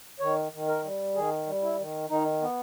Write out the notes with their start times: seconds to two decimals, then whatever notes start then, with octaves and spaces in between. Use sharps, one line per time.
0.20 D#3 C#5
0.52 D#3
0.67 A#4
0.84 G3
1.15 D#3 G#4
1.47 G3
1.62 E4
1.78 D#3
2.09 D#3 D#4
2.41 B3